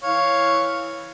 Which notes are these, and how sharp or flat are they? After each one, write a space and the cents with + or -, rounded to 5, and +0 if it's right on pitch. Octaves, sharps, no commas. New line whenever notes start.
E3 +0 C#5 +0 F5 +0